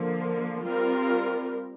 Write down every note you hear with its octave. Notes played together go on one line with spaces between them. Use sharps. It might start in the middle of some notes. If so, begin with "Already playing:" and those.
Already playing: D3 F3 A#3
G3 C4 F4 A#4